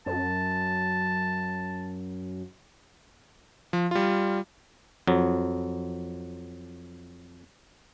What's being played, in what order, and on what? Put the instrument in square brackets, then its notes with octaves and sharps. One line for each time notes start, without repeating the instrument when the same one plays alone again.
[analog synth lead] F#2 [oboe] A5
[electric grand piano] F3
G3 F4
[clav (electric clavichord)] F2 F#3